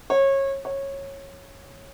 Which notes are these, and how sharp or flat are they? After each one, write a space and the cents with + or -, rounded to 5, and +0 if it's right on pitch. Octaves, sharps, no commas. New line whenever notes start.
C#5 -25
C#5 -15